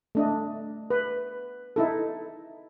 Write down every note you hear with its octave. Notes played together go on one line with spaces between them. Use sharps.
A3 D4 D#5
B4
D#4 E4 A4